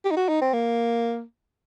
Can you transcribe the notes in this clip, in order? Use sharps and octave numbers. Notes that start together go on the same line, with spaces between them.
G4
D#4
F#4
D#4
C4
A#3